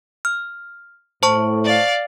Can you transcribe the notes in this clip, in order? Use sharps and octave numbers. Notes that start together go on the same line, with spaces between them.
F6
A2 C5 A5 C#6
D5 F5